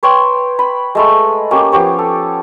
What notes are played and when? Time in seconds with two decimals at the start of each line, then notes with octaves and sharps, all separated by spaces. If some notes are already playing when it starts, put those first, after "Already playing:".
0.03 B4 C#5 G5 C6
0.59 B5
0.95 G#3 A3 B5
1.51 A#3 C#4 G4
1.72 F3 B3 G4 C#5
1.99 A4